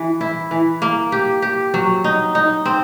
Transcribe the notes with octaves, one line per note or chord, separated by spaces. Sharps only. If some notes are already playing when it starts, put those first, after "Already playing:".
Already playing: E3
E4
E3
A#3
G4
G4
F#3
D#4
D#4
C4